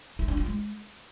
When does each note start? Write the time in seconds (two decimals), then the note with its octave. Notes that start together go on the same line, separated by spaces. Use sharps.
0.19 E4
0.28 D4
0.37 F4
0.46 G#3